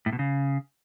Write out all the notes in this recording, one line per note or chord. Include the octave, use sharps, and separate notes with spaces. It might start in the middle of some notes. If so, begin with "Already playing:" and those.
A2
B2
C#3